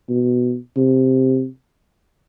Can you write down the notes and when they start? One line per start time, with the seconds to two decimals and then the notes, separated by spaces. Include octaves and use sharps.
0.09 B2
0.77 C3